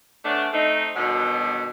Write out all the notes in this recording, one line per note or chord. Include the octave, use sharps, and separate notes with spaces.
A3 B3 C#4 D4
A3 C4 D#4
B2 D3 D#3 F#3 G3 B3